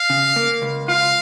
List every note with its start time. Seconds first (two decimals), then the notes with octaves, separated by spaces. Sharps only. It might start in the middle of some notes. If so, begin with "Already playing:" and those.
Already playing: F5
0.10 C#3
0.36 A#3
0.62 C#2
0.88 F4 F5